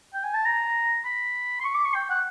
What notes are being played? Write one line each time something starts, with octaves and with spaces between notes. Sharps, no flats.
G5
G#5
A5
A#5
B5
C6
C#6
D6
C#6
G5
F#5